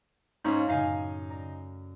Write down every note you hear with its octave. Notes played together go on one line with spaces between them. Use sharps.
G#2 C#4 F5 C#6 B6
F#2 A2 C#3 D#4 F5 G#5
D5 A#5